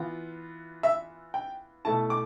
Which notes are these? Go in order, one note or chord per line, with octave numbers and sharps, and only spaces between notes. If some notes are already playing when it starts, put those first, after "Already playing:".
Already playing: E3 B3 F4
E5
G5
B2 A3 E4 A5
D6